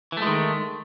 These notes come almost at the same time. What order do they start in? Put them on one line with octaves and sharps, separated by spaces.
E3 A3 G#3 D#3